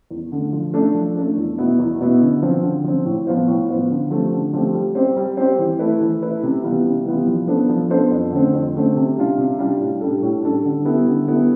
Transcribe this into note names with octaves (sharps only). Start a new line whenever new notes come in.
E2
D3 A3
F3
A3 D4 A4
F3
A3 D4 A4
E2
B2 B3 E4
E2
B2 B3 E4
D3
F3 C4
D3
F3 C4
A2
F3 B3 F4 C5
A2
F3 B3 F4 C5
D3
F3 A3 C4 G4
D3
F3 A3 C4 G4
G3
C4 G4 C5
G3
C4 G4 C5
E3
A3 E4 B4
E3
A3 E4 B4
C3
E3 G3 B3 F4
C3
E3 G3 B3 F4
F3
B3 D4 A4 C5
F3
B3 D4 A4 C5
F2
D3 A3 C4
F2
D3 A3 C4
C3
G3 D4 F4
C3
G3 D4 F4
A2
G3 D4 A4
A2
G3 D4 A4
D3
G3 B3 E4 A4
D3
G3 B3 E4 A4